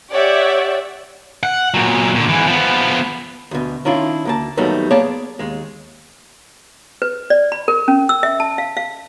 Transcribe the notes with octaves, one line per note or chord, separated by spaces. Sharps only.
G4 C#5 D5 E5 F#5
F#5
A#2 F#3
A#2 D3
G#2 E3
F3 B3
D2 B2
D#3 C#4 D4 E4 F4
D2 A#3 A5
D#2 D#3 F#3 G3 A3 B3
A#3 B3 G#4 C#5 D5 A5
D#2 G#3
B4
D5
B5
A#4
C#4
E6
E5
A5
F5
F5